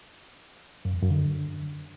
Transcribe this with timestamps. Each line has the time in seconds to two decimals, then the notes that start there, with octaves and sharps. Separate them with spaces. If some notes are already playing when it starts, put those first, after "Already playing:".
0.85 F#2
0.93 E2
1.02 F#2
1.10 D3